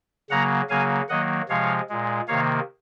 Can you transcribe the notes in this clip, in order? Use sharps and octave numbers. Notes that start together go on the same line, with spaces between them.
C#3 F#3 A#3 F#5 A#5
C#3 F#3 A#3 F5 G#5
D#3 F#3 A#3 D#5 F#5
C3 F3 G#3 C#5 F5
A#2 G#3
C3 D#3 A#3 C#5 F5